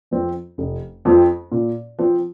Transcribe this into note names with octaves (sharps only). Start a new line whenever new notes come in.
F2 F3 C4
F1
F2 F3 C4
A#2
F3 C4